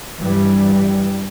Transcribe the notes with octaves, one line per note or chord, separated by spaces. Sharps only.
G2 E3 G3